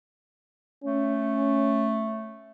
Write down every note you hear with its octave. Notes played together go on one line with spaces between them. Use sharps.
A3 C#4